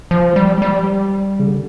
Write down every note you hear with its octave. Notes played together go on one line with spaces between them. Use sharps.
F3
G3
G3
C#3
D3